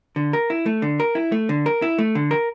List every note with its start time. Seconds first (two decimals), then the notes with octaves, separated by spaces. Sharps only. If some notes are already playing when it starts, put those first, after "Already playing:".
0.16 D3
0.33 A#4
0.50 E4
0.66 A3
0.82 D3
1.00 A#4
1.15 E4
1.32 A3
1.49 D3
1.66 A#4
1.82 E4
1.99 A3
2.15 D3
2.31 A#4